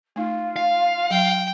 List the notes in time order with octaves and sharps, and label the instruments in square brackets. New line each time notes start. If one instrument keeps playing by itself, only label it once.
[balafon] A3 D#4 [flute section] F4
[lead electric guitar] F5
[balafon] F#3 [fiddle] G5